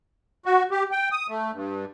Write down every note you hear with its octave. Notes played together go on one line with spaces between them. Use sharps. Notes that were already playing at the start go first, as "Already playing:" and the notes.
F#4
G4
G5
D#6
A3
G2